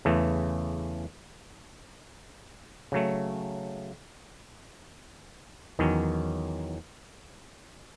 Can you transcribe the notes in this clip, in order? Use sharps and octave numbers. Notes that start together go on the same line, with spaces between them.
E2 C#3 E3 A3
C#3 F#3 A3
E2 D#3 F#3 C#4